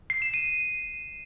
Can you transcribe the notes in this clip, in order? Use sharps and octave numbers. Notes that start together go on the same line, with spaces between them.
C7
E7
D#7